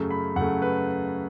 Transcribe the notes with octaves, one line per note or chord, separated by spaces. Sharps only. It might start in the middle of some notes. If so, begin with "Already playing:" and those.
Already playing: F#2 C#3 A3
B5
F#2 C#3 A3 F#5
B4